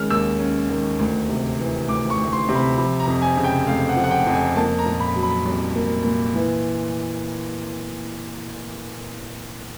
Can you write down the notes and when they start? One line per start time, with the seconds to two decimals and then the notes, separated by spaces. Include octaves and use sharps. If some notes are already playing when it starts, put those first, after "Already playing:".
Already playing: D#3 G#3 C#4 F6
0.10 D#2 E6
0.40 C#4
0.69 D#3
0.99 D2
1.29 C3
1.59 E3
1.88 D2 D6
2.10 C#6
2.18 D2
2.33 C6
2.49 C3
2.55 B5
2.78 F3 B5
3.00 A#5
3.07 F2
3.22 G#5
3.37 C#3
3.44 G5
3.67 F1 F5
3.89 F#5
3.96 F3
4.04 F#5
4.11 G5
4.27 F2
4.33 G#5
4.56 A#3 A5
4.79 A#5
4.86 A#2
5.00 B5
5.15 F#3
5.23 B5
5.46 C2
5.75 A#3
6.04 A#2
6.35 E3